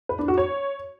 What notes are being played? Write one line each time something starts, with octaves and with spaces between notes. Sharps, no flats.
B4
D4
F#4
C#5